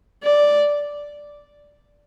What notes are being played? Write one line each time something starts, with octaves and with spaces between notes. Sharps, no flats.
D5